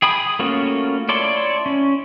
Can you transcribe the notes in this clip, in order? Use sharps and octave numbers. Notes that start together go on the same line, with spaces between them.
G#4 G5 B5 D#6
A3 A#3 C#4 F4 F#4
E4 C#5 D5 A5 C6
C#4